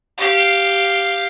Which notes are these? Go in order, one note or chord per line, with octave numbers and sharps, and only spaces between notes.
G4 F5